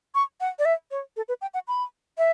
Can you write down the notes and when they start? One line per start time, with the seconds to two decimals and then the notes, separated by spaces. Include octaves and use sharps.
0.15 C#6
0.41 F#5
0.59 D5
0.65 E5
0.91 C#5
1.17 A4
1.28 B4
1.41 G5
1.54 F#5
1.68 B5
2.18 E5